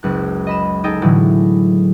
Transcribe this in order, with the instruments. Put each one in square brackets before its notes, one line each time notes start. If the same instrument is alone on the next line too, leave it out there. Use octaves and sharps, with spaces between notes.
[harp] F#1 C#2 F#6
D#5 B5 E7
D#4 G#4 A4 D#5 G5
A2 D3 E3 F#3 G#3